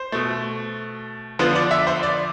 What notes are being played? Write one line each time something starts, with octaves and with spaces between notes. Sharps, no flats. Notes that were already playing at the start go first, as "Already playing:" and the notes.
Already playing: C5
B2 A3
D3 F3 B3 C5
D5
E5
C5
D5